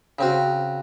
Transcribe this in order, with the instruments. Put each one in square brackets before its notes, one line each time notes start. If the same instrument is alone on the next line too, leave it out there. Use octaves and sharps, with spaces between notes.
[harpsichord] C#3 C4 F#4